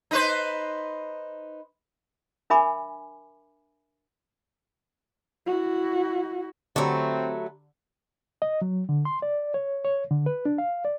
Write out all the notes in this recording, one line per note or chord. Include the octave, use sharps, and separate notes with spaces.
D#4 B4 C5
D4 A#4 E5 G#5 B5 D6
E4 F#4
D3 F#3 A3 C4 G4 A#5 B5
D#5
F#3
D3
C6
D5
C#5
C#5
D3
B4
D4
F5
D5